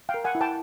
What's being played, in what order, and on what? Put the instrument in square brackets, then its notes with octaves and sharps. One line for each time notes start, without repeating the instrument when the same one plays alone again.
[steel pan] F5 G5
A#4
F#5 G#5
E4
G5 A5